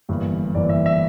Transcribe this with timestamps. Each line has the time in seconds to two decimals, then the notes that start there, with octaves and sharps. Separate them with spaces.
0.09 G1 G2 E3 A#3
0.55 G1 G2 E3 A#3 D5
0.69 E5
0.86 E5